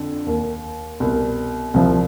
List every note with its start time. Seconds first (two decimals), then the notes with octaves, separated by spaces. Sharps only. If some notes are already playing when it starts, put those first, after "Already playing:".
Already playing: F2 D3
0.26 D#2 D#3
1.00 C2 B2
1.74 C2 C3 F3